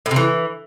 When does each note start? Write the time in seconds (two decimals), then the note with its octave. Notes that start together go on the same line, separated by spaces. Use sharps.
0.06 A2
0.11 C3
0.16 E3